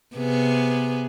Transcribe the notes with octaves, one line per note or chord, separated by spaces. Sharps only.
C3 B3 G#4